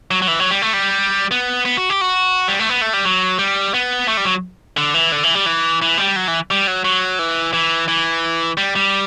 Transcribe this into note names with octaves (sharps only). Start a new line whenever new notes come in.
F#3
F#3
E3
F#3
G3
A3
G3
B3
B3
F#4
G4
F#4
G3
A3
B3
A3
G3
F#3
G3
B3
A3
G3
F#3
D3
E3
D3
E3
G3
E3
E3
G3
F#3
E3
G3
F#3
F#3
E3
E3
E3
G3
G3